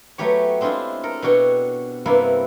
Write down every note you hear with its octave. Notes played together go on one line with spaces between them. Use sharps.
F#3 A3 B3 G4 C#5
G#3 C4 D4 E4 F4
A4 A#4
B2 D4 F#4 C#5 G5
G2 C3 A#3 B3 E4